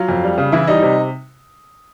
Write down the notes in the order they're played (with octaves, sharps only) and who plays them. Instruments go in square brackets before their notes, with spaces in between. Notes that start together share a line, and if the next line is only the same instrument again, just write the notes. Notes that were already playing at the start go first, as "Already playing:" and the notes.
Already playing: [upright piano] F#3 F4 F5
F2
G3
C#3
E3 E4 E5
G3 D#4 D#5
C3